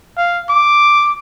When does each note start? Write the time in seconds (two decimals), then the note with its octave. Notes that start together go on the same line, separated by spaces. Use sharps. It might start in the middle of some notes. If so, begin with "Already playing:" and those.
0.17 F5
0.49 D6